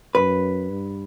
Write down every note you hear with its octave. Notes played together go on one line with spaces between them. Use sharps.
F#2 B4
G2